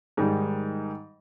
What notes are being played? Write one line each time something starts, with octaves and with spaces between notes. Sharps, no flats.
G#2 D#3 G3